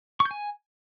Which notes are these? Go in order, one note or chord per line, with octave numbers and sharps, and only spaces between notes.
C#6
G6
G#5